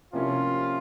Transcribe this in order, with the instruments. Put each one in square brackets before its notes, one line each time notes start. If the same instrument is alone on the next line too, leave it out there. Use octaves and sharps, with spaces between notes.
[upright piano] C3 F3 A#3 C#4 E4 [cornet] F4